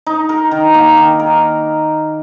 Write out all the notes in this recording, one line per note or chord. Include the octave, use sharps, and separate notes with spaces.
D#4
A#4
D#3
A#3
D#3
A#4